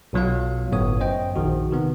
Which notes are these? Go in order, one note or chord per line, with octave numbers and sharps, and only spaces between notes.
B1 B2 F#3 F4 F5
G1 A2 B3 C#5 D#6
F#2 C5 D#5 G5
A#1 D#3 F#4
C3 D#3 B3